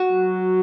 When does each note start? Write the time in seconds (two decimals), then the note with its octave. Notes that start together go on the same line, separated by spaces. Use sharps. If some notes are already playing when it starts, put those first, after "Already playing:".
Already playing: F#4
0.11 F#3